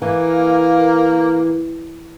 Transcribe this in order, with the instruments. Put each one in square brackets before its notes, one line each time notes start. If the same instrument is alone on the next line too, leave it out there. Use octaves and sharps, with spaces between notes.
[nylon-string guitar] E3 [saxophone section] A#3